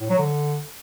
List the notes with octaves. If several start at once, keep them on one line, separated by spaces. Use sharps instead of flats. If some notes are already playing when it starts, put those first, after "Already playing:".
A2
F#3
D3